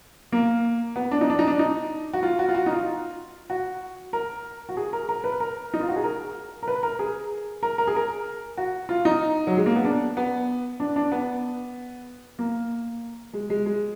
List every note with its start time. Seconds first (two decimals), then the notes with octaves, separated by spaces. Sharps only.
0.32 A#3
0.96 B3
1.11 D4
1.21 D#4
1.30 D4
1.39 D#4
1.47 D4
1.59 D#4
2.13 F#4
2.23 F4
2.39 F#4
2.49 F4
2.55 F#4
2.66 D#4
2.71 F4
3.50 F#4
4.13 A#4
4.69 F#4
4.77 G#4
4.93 A#4
5.09 A#4
5.24 B4
5.40 A#4
5.74 D#4
5.81 F4
5.89 F#4
5.96 G#4
6.04 A#4
6.63 A#4
6.68 B4
6.83 A#4
6.99 G#4
7.63 A#4
7.78 A#4
7.87 G#4
7.96 A#4
8.58 F#4
8.89 F4
9.05 D#4
9.47 F#3
9.57 G#3
9.66 A#3
9.76 B3
9.85 D4
10.17 B3
10.80 D4
10.96 D4
11.12 B3
12.39 A#3
13.33 G#3
13.50 G#3
13.66 G#3